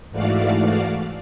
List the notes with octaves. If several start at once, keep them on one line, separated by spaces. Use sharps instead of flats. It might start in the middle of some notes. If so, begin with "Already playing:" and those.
G#2 E3 A3 F#4 D5 F5